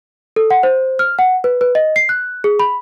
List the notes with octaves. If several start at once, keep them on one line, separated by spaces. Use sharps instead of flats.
A4
F#5
C5
F6
F#5
B4
B4
D#5
C7
F#6
G#4
B5